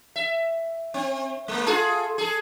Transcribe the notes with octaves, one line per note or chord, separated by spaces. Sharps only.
E5
C4
G#3 A#3
F4 G#4 A4
G#4 A4